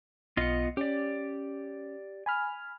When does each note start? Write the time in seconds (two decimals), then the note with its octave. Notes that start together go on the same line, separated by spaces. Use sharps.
0.37 B1 B3 F4 D#5 C#7
0.77 C#4 G4 D5
2.26 G#5 B5 F6